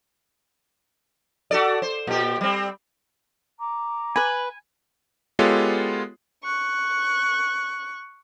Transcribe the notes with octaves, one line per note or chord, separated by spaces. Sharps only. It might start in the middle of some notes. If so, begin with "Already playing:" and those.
F#4 A4 D5
C5
A#2 G4
G3 C4
A#5 D6
B4 G#5 B5
G#3 B3 F4 G4 A4 C#5
C#6 F#6